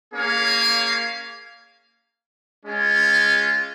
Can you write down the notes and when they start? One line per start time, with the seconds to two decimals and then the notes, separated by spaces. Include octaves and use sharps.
0.13 A#3 C#4 G#4 C#5 F5
2.63 G#3 C#4 F4